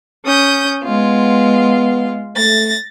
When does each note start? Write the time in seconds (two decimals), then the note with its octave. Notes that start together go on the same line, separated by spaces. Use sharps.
0.25 C#4 D#6 G6
0.84 G#3 B3 F4
2.36 A3 A6 A#6